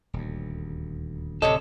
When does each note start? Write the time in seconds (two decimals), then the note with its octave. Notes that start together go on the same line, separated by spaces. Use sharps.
0.13 D#1 D2
1.42 D1 C3 A4 C#5 D#5